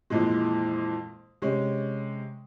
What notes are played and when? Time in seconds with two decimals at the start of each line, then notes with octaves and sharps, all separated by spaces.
0.10 F2 A#2 E3 G#3
1.42 C3 G#3 C#4